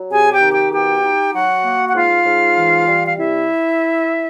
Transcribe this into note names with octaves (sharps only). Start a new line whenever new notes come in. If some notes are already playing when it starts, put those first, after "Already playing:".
Already playing: F#3
C3 G#4 G#5
G4 G5
D#3
G4 G5
B2 G4 G5
D#4
F#3 F#4 F#5
A#3
F#5
G#2 F4 F5
G#2
E3
G3
F5
C3 E4 E5